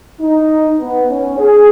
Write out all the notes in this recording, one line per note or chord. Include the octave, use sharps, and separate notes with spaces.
D#4
B3
C#4
G#4